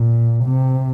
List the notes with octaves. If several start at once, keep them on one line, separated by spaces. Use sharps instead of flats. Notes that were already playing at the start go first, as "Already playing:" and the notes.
Already playing: A#2
C3